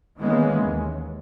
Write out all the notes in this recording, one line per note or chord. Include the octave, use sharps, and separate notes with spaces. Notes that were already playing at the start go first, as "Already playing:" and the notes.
D#3 E3 G#3 A#3 B3 C#4
D#2